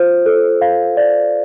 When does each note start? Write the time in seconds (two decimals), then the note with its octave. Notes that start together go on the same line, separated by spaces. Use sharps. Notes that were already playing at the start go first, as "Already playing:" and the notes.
Already playing: F4 C5
0.26 A4
0.61 F5
0.97 D5